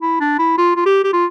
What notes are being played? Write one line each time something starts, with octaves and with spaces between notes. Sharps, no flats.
E4
D4
E4
F4
F4
G4
G4
F4